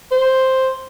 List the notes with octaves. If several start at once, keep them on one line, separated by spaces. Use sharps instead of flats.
C5